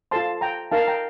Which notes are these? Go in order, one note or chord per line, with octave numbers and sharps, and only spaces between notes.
F4 A4 C5 A5 C6
G5 A#5
D#4 A#4 F5 A5
G5 A#5